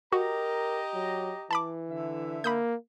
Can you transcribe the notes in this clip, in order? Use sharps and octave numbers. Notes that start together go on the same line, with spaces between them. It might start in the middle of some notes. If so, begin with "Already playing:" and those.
F#4 G4 A#4 D#5 A#5
F#3
E3 A5 B5 D6
D3 E5
A#3 B5 D#6 G6